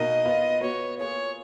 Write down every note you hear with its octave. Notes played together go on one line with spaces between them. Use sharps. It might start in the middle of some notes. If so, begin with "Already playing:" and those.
Already playing: B2 A#3 D#4 A#4 D#5 F5
B3 F4 B4 F5
B3 F#4 B4 C#5
A#3 F4 G#4 C#5